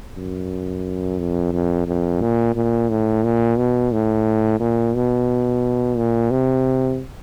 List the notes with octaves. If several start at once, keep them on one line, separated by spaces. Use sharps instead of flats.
F#2
F2
F2
F2
A#2
A#2
A2
A#2
B2
A2
A#2
B2
A#2
C3